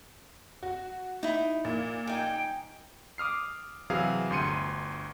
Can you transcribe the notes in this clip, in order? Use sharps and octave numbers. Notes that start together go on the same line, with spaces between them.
F#4
D#4 E4
A#2
D#4 G5 G#5
D6 D#6 F6 C7
C3 E3 F#3 G#4 F5
G1 D2 C6 C#7 D#7